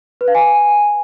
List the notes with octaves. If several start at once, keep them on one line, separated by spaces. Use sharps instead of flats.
B4
F5
G#5